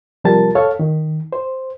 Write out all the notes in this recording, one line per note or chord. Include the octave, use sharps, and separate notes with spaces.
C3 F3 G3 A#4 A5 A6
A4 C#5 F5
D#3
C5